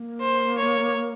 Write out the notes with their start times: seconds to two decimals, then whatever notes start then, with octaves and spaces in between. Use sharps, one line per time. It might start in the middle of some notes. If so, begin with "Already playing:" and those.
Already playing: A#3
0.21 C5
0.58 C#5